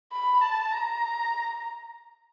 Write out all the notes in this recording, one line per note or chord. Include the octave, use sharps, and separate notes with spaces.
B5
A5
A#5